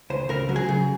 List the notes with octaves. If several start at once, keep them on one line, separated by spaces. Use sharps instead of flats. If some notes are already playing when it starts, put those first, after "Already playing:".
C#2 C5
C#2 A#4
F#3
G#4
C#3